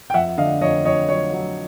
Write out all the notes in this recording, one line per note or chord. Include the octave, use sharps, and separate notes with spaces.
G5
F2 E5 F#5
D3 D#5 F5
F2 C#5 D#5
F2 C#5 D#5
F#3 C#5
F#3